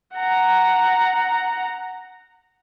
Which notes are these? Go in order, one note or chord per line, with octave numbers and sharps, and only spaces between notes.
F#5 A#5